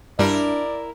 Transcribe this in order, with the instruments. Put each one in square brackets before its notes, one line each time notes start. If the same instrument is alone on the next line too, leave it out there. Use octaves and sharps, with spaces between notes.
[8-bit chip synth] G2 G3 [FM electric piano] D4 [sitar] E4 A#4 [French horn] D5